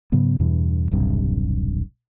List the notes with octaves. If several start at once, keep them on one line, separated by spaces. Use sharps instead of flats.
G#2 C#3 F#3 B3
E2 G2 B2 E3
D#1 B1 G2 C3